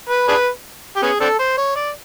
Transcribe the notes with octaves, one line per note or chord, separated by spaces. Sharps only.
B4
D4 G#4 B4
G4
B3 C#4 G#4
C4 D4 A4
C5
C#5
D5